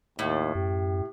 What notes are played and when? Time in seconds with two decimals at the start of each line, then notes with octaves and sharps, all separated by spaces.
0.19 D#2 A2
0.55 F#2 G4